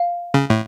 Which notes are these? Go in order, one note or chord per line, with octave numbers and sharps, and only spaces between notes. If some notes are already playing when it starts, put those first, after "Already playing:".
Already playing: F5
C#3
A2